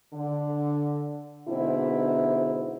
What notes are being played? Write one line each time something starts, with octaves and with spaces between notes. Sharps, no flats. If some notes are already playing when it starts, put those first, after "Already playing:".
D3
G#2 B2 D3 C4 E4